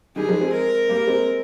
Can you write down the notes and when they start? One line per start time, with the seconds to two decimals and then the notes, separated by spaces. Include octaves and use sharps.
0.16 D#3 G3 G#4
0.29 F3 G#3
0.41 G#3 C4
0.53 A#4
0.89 G3 A#3
1.07 G#3 C4